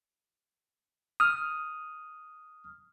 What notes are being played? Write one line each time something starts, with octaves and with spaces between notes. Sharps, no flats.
D#6 F6